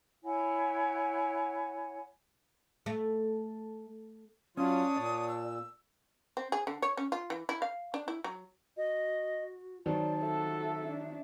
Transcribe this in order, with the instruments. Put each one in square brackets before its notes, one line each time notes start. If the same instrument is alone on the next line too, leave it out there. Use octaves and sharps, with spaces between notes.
[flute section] E4 C#5 F#5 G#5
[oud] A3
[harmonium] F#3 F4 [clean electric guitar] C#4 [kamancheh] D4 C#5 [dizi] D#6
[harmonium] A#2 [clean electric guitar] D5
[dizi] E6
[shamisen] C4
G#4
D3
C#5
C#4
F4
E3
E4
F5
D4
E4
F#3
[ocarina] F#4 [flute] D#5
[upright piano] D#3 F#3 C4 [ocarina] D5 [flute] A5
[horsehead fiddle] F#4 A4 [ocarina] E5
[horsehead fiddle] D4